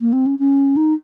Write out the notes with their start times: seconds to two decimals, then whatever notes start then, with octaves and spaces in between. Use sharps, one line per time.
0.01 A#3
0.13 C4
0.26 C#4
0.39 C#4
0.77 D#4